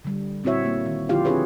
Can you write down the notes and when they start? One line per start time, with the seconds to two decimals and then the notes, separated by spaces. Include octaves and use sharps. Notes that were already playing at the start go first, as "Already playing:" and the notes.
0.04 D3 G3
0.44 A#2 C4 E4 F#4 C#5 E5
0.66 A#3
0.86 D#3
1.09 D3 F3 E4 F4 G4 F5
1.25 C4 D4 G4 G#4 B4 C#5